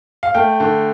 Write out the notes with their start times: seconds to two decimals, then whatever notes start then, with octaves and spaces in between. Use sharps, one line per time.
0.23 F5
0.34 A3 G5
0.60 D3